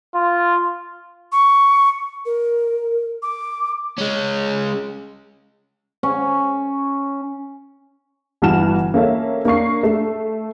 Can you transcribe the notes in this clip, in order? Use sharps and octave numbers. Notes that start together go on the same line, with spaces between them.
F4
C#6
A#4
D6
G#3 C#4
C#4
G1 E3 F#4 A5 F6 E7
A#3 C#4 A4 E5
A#3 D4 C#6 C7
A3 E5